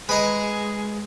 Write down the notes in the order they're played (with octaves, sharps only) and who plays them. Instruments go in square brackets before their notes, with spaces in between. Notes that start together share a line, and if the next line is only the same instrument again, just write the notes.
[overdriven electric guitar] G#3 [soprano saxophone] G#4 [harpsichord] B4 D#5 A#5